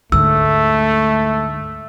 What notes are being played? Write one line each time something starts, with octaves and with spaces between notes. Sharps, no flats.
D2 G#2 A3 E6